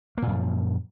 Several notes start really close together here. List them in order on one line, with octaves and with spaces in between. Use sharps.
A#3 A#2 F#2 F3